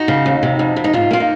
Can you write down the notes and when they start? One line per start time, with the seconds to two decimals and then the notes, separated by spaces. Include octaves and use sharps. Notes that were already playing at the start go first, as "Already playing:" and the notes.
Already playing: D#4 F#4
0.08 C#3
0.26 D#2
0.43 C3
0.59 F2
0.76 C3
0.84 D#4
0.93 G#2 F4
1.11 A#3 F4
1.20 D#4